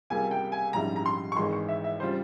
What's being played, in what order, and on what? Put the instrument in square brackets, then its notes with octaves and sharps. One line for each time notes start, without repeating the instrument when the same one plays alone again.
[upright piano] C#2 C3 G3 A#3 [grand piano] G#5
[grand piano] G5
G#5
[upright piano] A#1 G#2 G3 C#4 E4 [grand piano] A#5
[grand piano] A#5
C6
C#6
[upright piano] G#1 G#2 E3 G#3 [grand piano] C6
[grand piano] C#6
E5
E5
[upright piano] C#3 G3 C4 F4 [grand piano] C5